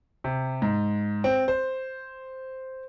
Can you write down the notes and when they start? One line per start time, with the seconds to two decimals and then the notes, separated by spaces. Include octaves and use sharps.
0.24 C3
0.62 G#2
1.24 C4
1.48 C5